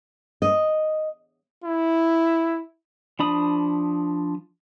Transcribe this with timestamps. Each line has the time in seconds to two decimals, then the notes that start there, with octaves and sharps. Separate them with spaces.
0.42 D#5
1.64 E4
3.19 F3 D4 B5 D#6